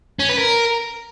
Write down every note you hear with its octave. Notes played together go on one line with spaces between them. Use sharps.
C#4
B4
A#4